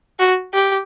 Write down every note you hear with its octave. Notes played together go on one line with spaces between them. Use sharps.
F#4
G4